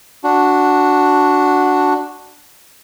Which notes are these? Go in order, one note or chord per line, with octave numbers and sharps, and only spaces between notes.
D4 F#4